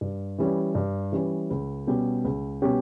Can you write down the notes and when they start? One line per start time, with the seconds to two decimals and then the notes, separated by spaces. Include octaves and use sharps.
0.01 G2
0.39 E3 G3 C#4
0.75 G2
1.12 E3 G3 C#4
1.50 C#2
1.87 B2 G3 C#4 G4
2.24 C#2
2.62 B2 G3 C#4 G4